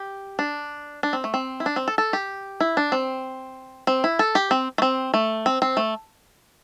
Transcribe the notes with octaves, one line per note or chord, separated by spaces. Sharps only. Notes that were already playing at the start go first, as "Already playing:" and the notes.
Already playing: G4
D4
D4
C4
A3
C4
E4
D4
C4
A4
A4
G4
E4
D4
C4
C4
E4
A4
G4
C4
A3
C4
A3
C4
C4
A3